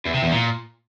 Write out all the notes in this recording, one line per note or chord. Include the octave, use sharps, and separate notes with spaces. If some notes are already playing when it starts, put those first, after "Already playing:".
E2
C3
E2
A#2